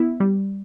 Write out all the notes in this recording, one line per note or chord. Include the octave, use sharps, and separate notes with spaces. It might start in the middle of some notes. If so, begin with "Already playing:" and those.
Already playing: B3 E4
G3